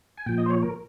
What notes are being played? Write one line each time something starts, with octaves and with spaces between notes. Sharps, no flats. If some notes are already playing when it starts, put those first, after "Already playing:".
G#5
A#2 F3 G5
D#5
C5
C#5
A#4